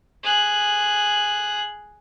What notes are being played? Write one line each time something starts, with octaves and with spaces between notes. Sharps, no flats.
G#4 F#6